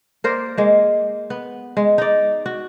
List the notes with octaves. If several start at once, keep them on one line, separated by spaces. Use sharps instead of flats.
A#3 A#4 C5 D5
G#3 A#3
B3
G#3
D#4 D5
F#4